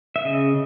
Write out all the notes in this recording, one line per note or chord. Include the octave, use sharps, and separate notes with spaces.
E5
C#3 D#5